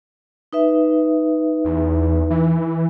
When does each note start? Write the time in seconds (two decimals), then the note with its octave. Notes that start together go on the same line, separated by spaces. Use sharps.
0.53 D#4 B4 E5
1.65 E2
2.30 E3